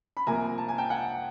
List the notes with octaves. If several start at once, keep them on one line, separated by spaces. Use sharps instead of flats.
B5
C2 C3 F3 A#3 G#5 A#5
A5
G#5
G5 A5
F#5 G#5